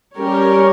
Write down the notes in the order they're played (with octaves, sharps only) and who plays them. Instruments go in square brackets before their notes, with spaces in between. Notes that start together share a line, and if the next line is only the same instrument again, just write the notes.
[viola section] G3 C#4 G4 A#4 C#5